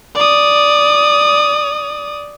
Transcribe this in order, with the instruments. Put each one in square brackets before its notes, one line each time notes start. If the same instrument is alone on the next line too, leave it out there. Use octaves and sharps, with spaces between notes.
[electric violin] D5 D#6